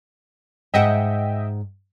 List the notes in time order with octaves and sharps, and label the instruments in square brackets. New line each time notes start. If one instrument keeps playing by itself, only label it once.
[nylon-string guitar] G#2 F#5 [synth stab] D#5 E5 G5